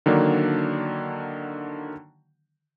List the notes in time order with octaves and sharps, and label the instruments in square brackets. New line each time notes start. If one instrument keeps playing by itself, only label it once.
[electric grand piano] D3 D#3 F#3 A#3 D4